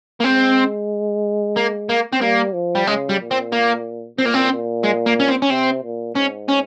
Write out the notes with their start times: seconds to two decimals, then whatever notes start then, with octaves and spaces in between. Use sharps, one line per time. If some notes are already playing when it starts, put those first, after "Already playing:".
0.20 A#3
0.24 G#3 C4
1.56 A#3
1.89 A#3
2.13 C4
2.22 G3 A#3
2.54 F3
2.75 G3
2.87 C#3 G#3
3.09 G3
3.21 A#2
3.31 C4
3.52 A#3
4.18 A#2 C4
4.26 A#3
4.34 C4
4.51 A#2
4.84 G#3
5.06 A#3
5.20 C#4
5.28 C4
5.42 C#4
5.50 C3 C4
5.83 A#2
6.16 G#2 C#4
6.49 C#4